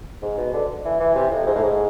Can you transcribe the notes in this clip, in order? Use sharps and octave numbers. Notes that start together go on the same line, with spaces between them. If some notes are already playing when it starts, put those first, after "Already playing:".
G#2
B2
D3
E3
E3
C3
F2
G#2
A2
G#2